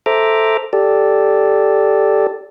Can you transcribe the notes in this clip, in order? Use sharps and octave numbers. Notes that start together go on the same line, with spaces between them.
A4 C5 E5 A#5 D6
G4 A4 D5